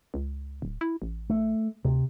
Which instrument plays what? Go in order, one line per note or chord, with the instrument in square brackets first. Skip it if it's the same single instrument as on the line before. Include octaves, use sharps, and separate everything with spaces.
[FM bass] C#2
D1
E4
A1
[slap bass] A3
[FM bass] D2 [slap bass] C3